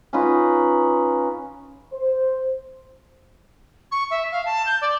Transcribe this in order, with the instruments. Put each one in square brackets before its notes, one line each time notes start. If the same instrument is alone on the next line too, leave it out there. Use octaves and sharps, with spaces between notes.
[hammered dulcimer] C#4 D#4 F4 B4
[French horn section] C5
[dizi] C#6
E5
F5
A5
G6
D5